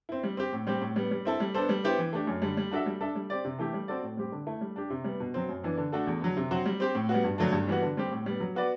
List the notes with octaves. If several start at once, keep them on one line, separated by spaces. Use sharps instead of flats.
C4 E4
G3
C4 G4
A2
G3 C4 G4
A2
G3 B3
G3
C4 E4 A4
G3
B3 D4 A4 C5
G3
B3 E4 G4 C5
E3
A3 D4 G4
F#2
D3 G3
G3
D4 F#4 A4 E5
G3
D4 A4 E5
G3
C4 G4 D5
C3
E3 A3 E4 G4
G3
C4 F#4 A4 D5
A2
G3 C4 G4
D3
A3 E4
G3
D4 G4
C3
G3 B3
B2
F#3 C4
F#2
E3 B3 D4
D3
A3 D4 F#4 A4
E2
D3 F#3
C3
F#3 C4 F#4 C5
G3
C4 G4 C5
A2
G3 B3 F#4
G2
D3 F#3 A3 D4
G2
E3 G3 B3 F#4
D3
G3 C4 G4
A2
G3 B3
F#3
B3 F#4 B4 D5